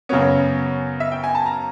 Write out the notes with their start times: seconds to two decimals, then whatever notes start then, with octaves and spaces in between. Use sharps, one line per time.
0.09 F#2 C#3 F#3 B3 C#5
1.00 E5
1.12 G5
1.24 G#5
1.35 A5
1.46 A#5